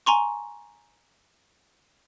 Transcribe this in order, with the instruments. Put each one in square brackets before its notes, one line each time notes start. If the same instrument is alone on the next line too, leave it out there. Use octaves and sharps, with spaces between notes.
[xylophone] G#5 A#5 C6 C#6